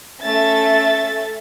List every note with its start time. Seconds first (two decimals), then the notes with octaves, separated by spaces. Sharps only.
0.22 A3 C#4 E5 A6